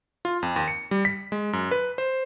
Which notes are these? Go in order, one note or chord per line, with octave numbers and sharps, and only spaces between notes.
F4
F2
D#2
C#7
G3
B6
G#3
F#2
B4
C5